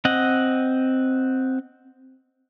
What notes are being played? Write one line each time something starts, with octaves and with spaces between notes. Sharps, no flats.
C4 D#5 F#5